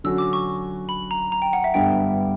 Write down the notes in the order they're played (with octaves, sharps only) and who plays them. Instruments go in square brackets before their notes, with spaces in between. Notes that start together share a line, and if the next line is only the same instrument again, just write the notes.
[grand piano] D3 F#3 C#4 F#4 [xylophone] E6
[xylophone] D6
C#6
B5
A#5
A#5
G5
F#5
E5
[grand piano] G2 D3 G3 B3 D4 [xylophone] G5